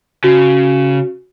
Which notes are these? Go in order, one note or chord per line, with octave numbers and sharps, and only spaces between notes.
C#3 F#4